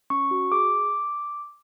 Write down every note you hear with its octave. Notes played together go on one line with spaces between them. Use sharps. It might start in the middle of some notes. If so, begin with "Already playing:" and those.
C#4 C#6
F#4
G#4 D6